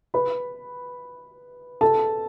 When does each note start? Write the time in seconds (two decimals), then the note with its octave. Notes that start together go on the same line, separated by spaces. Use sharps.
0.14 B4 B5
1.81 A4 A5